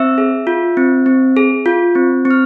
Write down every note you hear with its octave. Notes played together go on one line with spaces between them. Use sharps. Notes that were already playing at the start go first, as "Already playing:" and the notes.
Already playing: C4 E5 E6
G#4
F4
C4
C4
G#4
F4
C4
C4
F6